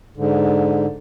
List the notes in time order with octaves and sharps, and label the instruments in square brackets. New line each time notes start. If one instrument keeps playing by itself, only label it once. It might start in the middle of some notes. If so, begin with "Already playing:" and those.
[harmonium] G#2 D3